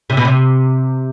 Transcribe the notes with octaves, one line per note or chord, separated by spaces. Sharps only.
C3
B2
C3